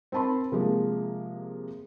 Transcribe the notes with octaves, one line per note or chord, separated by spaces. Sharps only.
C4 A#4 A5 B5 C6
C3 F3 G#3 A#3